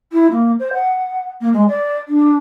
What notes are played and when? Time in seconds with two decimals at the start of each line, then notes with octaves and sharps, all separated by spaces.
0.12 E4
0.31 A#3
0.59 C5
0.73 F#5
1.41 A#3
1.53 G#3
1.68 D5
2.08 D4